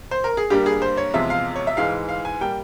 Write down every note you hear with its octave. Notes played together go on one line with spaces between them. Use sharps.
C5
A#4
G#4
G2 G3 A#3 G4
G#4
C5
C#5
E2 C3 F3 G#3 E5
F5
C#5
E5
G#2 E3 G#3 F5
F5
G#5
G3 A#3 G5